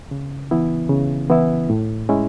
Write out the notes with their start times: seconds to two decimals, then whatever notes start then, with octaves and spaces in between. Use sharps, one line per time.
0.11 C#3
0.51 E3 B3 E4
0.90 C#3
1.30 E3 B3 E4
1.70 A2
2.09 G#3 C#4 E4